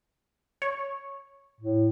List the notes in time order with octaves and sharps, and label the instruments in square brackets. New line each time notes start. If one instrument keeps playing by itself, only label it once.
[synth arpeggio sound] C#5
[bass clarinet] A2